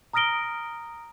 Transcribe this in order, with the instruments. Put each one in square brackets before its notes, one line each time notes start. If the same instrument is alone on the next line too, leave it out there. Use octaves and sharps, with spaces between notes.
[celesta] A#5 D#6 F6 A#6 D7 G7